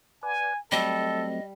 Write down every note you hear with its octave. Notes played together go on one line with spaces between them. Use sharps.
B4 D5 F#5 G#5
F#3 G3 A3 C4 A4 D#5